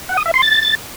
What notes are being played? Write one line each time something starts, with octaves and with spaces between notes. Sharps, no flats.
F#5
D#6
E5
C6
A6